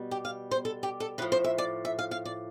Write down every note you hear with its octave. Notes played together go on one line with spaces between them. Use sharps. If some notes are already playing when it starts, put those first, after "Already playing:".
Already playing: B2 G3
G4
F5
C5
A4
G4
A4
A2 F3 B4
C5
E5
D5
E5
F5
F5
D5